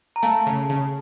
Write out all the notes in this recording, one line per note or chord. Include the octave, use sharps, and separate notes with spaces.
A#5
A3 F5 A5
C#3
C#3